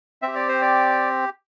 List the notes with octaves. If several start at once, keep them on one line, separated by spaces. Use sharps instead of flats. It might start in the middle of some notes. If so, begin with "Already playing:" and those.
C4 E5
G4
D5
C5
D5